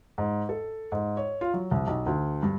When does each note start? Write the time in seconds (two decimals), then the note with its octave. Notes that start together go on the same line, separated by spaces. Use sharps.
0.18 G#2
0.49 A4
0.92 G#2
1.17 C#5
1.41 F4
1.54 F#3
1.71 C2
1.87 B1
2.06 D2
2.43 G2